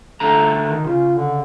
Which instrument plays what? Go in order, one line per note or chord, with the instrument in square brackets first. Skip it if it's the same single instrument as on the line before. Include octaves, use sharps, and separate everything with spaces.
[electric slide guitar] D3 A3 A#5 [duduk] A4
[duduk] D#3
[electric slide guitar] C#3 [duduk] F4
[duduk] D3